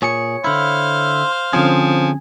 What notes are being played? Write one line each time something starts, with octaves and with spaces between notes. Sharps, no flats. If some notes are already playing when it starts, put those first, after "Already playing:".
A#2 G#4 C#5 C#7
D3 E4 C5 F5
D3 F3 C4 C#4 G#4